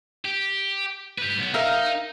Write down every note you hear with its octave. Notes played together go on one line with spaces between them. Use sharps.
G4
G4 B4
B1 B3
D#4 A#4 E5 F5